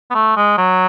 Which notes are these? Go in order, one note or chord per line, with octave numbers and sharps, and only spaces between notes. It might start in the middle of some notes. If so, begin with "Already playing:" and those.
B3
A3
G#3
F#3